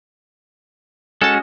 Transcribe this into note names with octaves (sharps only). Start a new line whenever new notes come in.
G#3 C#4 F#4 A4 A5